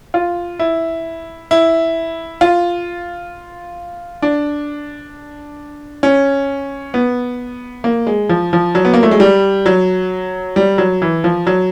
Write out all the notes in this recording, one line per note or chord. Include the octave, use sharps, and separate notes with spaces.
F4
E4
E4
F4
D4
C#4
B3
A#3
G#3
F3
F3
F#3
B3
A#3
A3
G#3
G3
F#3
G3
F#3
E3
F3
F#3